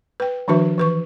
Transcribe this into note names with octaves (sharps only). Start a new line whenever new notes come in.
B4 G5
D#3 F3 D4 F#4 B4 E5
E3 B4 C#6